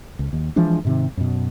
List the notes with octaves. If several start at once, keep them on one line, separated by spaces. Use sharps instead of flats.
C#2
D#2
E3 F3 G#3 D4
G#2 C3 D#3
F#2 B2